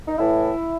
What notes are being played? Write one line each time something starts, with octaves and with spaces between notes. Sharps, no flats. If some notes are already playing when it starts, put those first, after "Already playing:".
D#4
A2 E3 E4